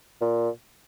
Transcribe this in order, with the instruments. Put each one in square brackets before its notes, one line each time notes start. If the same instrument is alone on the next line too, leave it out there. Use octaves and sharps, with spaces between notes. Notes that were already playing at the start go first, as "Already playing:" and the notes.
[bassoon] A#2